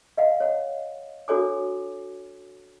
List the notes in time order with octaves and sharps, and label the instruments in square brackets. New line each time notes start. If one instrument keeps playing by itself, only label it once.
[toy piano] D#5 F5 F#5
C#5 F#5
D4 F#4 A4 C#5 G#5 D6